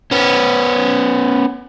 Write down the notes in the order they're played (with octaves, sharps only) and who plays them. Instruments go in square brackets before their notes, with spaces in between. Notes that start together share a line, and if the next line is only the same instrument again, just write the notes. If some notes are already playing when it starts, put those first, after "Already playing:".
[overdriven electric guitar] B3 C#4